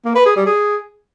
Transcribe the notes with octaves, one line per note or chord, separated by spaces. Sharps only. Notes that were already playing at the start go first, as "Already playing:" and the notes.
A#3
B4
G#4
G3
G#4